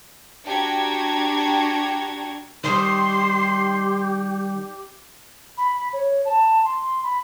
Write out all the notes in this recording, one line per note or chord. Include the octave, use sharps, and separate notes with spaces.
D4 F#4 G4 A#5 G#6
D#3 G3 G4 C6
B5
C#5
A5
C6
B5